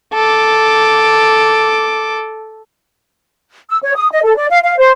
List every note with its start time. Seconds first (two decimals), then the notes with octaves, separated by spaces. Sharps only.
0.13 A4 D6
3.69 E6
3.83 C#5
3.96 D#6
4.12 D#5
4.24 A4
4.36 D5
4.50 F5
4.64 F5
4.78 C5